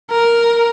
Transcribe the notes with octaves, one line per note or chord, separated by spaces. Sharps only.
A#4